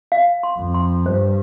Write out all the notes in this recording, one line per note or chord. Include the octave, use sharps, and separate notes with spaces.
F5
C6
F2
C6
G2 C5